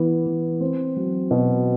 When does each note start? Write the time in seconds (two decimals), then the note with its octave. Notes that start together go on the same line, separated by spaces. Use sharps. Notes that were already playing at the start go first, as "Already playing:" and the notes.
Already playing: E3 B3 E4
0.26 E3
0.60 C4
0.96 F#3
1.31 B2